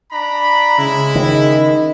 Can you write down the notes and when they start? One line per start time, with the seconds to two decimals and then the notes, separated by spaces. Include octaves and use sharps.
0.11 D4 A#5 B5
0.79 C#3 G#3 E4 B5
1.15 D#3